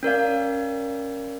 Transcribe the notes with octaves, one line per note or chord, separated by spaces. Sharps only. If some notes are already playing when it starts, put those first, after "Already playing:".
C#4 A#4 D5 F5